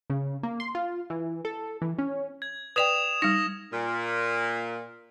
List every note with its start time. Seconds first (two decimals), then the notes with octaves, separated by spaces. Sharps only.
0.10 C#3
0.43 A#3
0.60 C6
0.75 F4
1.10 E3
1.45 A4
1.82 E3
1.99 C#4
2.42 G#6
2.76 B4 D5 G5 D#6 E7 F7
3.22 G3 D#4 A#6
3.72 A#2